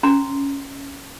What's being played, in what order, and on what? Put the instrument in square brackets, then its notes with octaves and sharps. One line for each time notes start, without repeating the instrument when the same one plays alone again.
[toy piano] C#4 A#5 C6